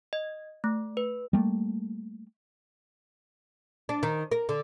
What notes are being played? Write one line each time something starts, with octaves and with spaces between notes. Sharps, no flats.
D#5
A3
B4
G3 A3 A#3
D4
D#3
A#4
D3